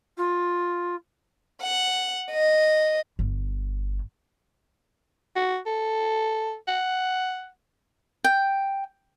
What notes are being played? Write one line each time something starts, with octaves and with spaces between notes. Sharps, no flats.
F4
F#5
D#5
G1
F#4
A4
F#5
G5